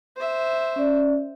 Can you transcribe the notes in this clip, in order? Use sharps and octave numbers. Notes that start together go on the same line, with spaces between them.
C5 E5
C#4 D5